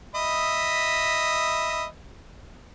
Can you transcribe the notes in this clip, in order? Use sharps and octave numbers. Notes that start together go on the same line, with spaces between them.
D#5 E5 B5